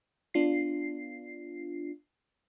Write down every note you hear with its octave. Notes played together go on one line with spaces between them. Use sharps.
B3 D4 F4 C7